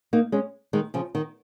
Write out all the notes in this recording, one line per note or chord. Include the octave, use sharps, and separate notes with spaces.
A#3 D#4
G#3 C#4
D#3 G#3
C#3 F3
D#3